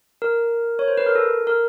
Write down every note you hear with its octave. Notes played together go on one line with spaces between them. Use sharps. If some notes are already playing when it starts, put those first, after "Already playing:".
A#4
C#5
C5
B4
A#4
A4
A#4